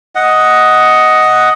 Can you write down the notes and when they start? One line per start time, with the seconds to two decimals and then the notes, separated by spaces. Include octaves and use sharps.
0.15 D#5 F#5